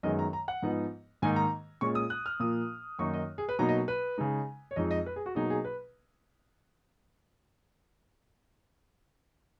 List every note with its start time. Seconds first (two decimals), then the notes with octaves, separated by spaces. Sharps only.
0.03 F#2 D#3 G#3 B3 D#5
0.19 A#5
0.33 A#5
0.48 F#5
0.62 G#2 F3 B3 D#4
1.22 G#2 D#3 A#3 D#4 G#5
1.36 A#5
1.81 A#2 G#3 C#4 C#6
1.95 D#6
2.10 F#6
2.26 F6
2.40 A#2 F3 A#3 D#6
2.99 F#2 D#3 A#3 D#4 C#6
3.14 D#5
3.38 G#4
3.49 B4
3.59 B2 F#3 A#3 D#4 A#5
3.69 D#5
3.88 B4
4.18 C#3 G#3 D#4
4.71 C#5
4.76 F2 F3 G#3 D#4 D#5
4.91 D#5
5.06 B4
5.16 G#4
5.26 F#4
5.35 B2 F#3 A#3 D#4 G#4
5.50 G#4
5.65 B4